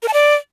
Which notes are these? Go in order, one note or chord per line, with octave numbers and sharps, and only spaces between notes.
A#4
A5
D5